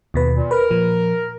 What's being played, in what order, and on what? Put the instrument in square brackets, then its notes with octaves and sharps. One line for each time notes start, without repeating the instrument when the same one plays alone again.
[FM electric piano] D#2 B2 B4
[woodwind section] A#2
[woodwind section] A#4 [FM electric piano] B4
[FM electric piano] A#2 F3